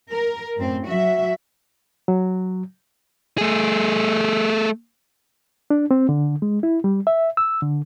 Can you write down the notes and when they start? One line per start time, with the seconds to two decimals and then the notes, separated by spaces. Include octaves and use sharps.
0.11 A#4
0.57 F#2 A2 C4
0.87 F#3 F#4 E5
2.08 F#3
3.38 A3 G#4
5.70 D4
5.91 C4
6.09 D3
6.42 G#3
6.63 E4
6.84 G3
7.07 E5
7.37 E6
7.62 D3